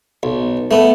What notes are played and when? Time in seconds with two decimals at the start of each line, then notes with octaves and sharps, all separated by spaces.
0.23 B1
0.71 A3 B3